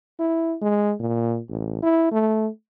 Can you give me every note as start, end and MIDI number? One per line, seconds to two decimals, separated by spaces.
0.20 0.56 64
0.62 0.94 56
1.00 1.39 46
1.50 1.79 33
1.82 2.10 64
2.12 2.48 57